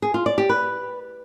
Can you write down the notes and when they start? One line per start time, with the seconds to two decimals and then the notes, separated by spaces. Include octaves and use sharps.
0.02 G#4
0.14 F4
0.26 D5
0.38 G4
0.49 B4